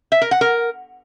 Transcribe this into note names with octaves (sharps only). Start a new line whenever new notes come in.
E5
A#4
F#5
A#4